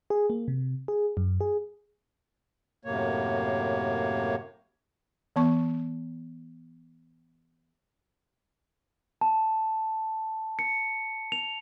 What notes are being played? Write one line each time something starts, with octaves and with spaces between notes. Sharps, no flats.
G#4
A#3
C3
G#4
F#2
G#4
F#2 A2 C3 A#3 C#5
E3 B3 C#6
A5
C#7
F7